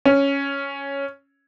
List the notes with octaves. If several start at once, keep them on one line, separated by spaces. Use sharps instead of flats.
C#4